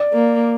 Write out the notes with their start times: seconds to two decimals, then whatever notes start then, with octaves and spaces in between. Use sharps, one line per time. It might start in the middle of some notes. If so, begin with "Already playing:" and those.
Already playing: D5
0.13 A#3